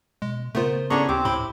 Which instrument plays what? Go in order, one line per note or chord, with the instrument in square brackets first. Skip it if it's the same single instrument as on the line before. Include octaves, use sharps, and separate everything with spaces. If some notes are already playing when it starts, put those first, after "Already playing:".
[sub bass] B2 [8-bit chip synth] G#3
[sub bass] C#3 [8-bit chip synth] A3 B3 F4 [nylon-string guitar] A#4 C5
[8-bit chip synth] B3 G#4 [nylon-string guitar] C#4 E4 A4 [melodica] D4 A#5 C#6
[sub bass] D2 [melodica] C4 C5 D6 [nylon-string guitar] G4
[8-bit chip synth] A2 B5 C6 [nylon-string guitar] E4